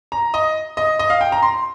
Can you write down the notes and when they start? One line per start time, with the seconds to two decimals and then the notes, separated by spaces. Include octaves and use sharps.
0.12 A#5
0.34 D#5
0.77 D#5
0.99 D#5
1.10 F5
1.21 G5
1.32 A#5
1.42 C6